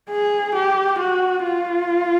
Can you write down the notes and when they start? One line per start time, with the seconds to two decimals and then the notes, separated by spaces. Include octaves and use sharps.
0.10 G#4
0.55 G4
0.99 F#4
1.44 F4